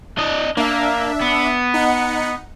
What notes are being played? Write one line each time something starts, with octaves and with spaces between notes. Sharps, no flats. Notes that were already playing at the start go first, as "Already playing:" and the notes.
D4 D#5
A#3 D4 E5
B3
D#4 F#5 C#7